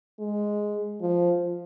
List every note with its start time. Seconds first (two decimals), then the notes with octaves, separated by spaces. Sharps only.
0.19 G#3
1.01 F3